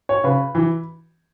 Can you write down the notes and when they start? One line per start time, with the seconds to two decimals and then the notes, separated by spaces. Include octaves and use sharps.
0.09 C#5
0.24 C#3 B4
0.55 E3